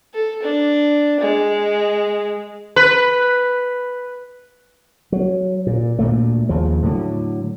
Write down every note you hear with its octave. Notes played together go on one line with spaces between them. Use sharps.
A4
D4
G#3
B4
F#3
A#2
D2 A#2 A3
D#2 C#3 F3
A2 D3 F#3